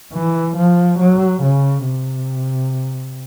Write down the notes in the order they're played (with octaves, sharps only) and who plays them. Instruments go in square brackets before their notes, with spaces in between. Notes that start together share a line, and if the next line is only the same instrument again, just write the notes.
[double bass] E3
F3
F#3
C#3
C3